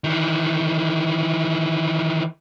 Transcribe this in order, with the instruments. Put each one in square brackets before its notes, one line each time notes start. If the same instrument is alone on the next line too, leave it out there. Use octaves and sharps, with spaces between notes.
[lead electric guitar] D#3 E3